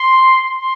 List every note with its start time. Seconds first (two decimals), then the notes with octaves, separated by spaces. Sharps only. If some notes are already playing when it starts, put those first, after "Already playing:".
Already playing: C6
0.59 C6